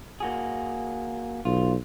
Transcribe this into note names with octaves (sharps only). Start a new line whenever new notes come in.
A#3 F#4 G#4
B1 F4